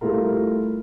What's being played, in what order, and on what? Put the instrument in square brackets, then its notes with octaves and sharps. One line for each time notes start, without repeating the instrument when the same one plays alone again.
[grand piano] G3 A3 E4 F4 A#4